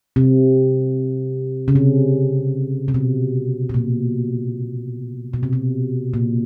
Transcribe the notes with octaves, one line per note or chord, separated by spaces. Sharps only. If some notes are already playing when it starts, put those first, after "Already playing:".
C3
C#3
C3
C3
B2
B2
A#2
B2
C3
B2
A#2